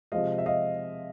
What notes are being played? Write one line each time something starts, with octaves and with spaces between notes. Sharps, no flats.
C3 F3 G#3 D#5 F5
E5
D#5 F5